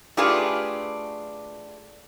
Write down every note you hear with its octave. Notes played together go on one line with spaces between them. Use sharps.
A3 D4 F4 G4 G#4 B4